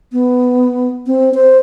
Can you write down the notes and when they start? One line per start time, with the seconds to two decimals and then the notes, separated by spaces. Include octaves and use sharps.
0.12 B3
1.07 C4
1.34 C5